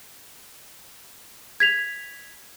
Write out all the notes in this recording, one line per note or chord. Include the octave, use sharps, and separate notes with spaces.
G#6 B6 F7